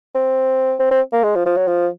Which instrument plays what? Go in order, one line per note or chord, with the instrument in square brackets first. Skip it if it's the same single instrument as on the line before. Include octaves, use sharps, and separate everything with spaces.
[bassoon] C4
C4
C4
A#3
G#3
F3
F3
F#3
F3